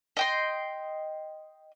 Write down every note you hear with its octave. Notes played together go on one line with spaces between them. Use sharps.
D#5 G5 C6